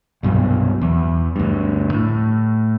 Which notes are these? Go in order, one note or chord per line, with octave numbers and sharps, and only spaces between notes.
C2 G2 B2 F#3
E2
D2 G2
A2